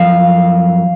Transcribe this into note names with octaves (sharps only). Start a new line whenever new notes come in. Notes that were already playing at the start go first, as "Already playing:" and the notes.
Already playing: F#2 F3 F5